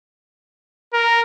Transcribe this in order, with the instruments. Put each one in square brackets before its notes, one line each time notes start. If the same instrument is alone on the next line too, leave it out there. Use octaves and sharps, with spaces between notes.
[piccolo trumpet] A#4